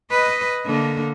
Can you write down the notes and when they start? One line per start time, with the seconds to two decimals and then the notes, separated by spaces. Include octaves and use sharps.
0.11 B4 D#5
0.66 D3 A#3